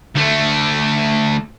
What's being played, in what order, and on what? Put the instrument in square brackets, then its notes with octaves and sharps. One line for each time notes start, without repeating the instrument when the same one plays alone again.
[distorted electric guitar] D2 A3